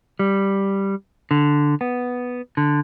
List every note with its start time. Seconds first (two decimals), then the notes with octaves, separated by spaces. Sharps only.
0.19 G3
1.31 D3
1.81 B3
2.57 D3